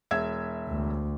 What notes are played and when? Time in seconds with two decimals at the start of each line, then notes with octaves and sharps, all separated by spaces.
0.11 E1 E5 G#6
0.68 D2